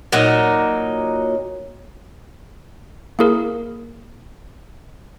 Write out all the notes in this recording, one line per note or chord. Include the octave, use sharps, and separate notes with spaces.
A#2 F#3 D#4
A#3 E4 G#4 A#4